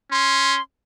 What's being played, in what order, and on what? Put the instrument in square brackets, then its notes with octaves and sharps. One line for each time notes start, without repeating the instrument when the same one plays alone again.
[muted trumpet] C#4 [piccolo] C6